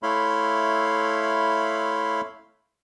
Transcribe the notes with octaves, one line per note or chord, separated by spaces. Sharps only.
A3 E4 C#5 F5 B5 C6